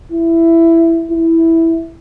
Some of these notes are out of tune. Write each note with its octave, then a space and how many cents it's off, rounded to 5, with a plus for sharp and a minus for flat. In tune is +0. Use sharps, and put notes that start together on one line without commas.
E4 +10
E4 -5